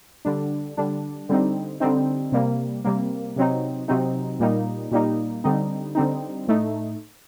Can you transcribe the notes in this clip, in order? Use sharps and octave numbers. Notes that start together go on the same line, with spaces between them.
D3 G3 D4
D3 G3 D4
D3 G3 C4 D#4
D3 G3 C4 D#4
C3 G3 A#3
C3 G3 A#3
C3 F#3 C4 D#4
C3 F#3 C4 D#4
A#2 G3 A#3 D#4
A#2 G3 A#3 D#4
D3 G3 C4 D#4
D3 G3 C4 D#4
A2 A3 D#4